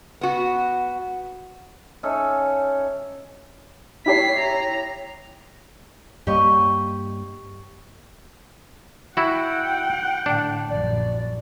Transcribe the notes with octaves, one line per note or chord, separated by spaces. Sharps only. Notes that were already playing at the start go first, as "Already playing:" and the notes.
B3 F#4
C#4 D#4 A4 E5
E4 G4 C#5 B6 C7
A#5
G2 G3 A#3 G4 C#5 D#5
E4 F#4 F#5 G5
A2 D3 D4
A#1 F#2 D5